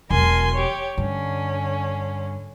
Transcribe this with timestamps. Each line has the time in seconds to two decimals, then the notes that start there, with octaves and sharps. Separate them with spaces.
0.10 E1 F#3 A#4 G#5 C6
0.54 G4 C#5
0.98 G2 D3 C#4